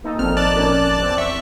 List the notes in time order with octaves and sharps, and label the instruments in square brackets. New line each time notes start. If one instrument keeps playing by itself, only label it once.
[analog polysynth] A#2 D#4 A4
[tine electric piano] G#1 F3 [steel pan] C4 [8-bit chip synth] F6
[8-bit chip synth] D5 A5 F#6
[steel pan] C#4 A#4
[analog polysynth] E2 C4
[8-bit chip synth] E5 C#6